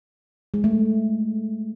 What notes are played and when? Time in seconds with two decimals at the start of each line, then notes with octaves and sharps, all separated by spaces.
0.54 G#3
0.64 A3